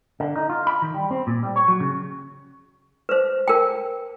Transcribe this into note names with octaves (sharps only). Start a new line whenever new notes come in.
D3
D#4
F4
B5
D#3
G3
C4
A#2
G3
C#5
F#3
C#3
B4 C5
A#4 G5